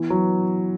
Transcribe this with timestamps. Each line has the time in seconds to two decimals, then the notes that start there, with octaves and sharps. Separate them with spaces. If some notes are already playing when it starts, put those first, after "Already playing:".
Already playing: E3 B3
0.10 F#3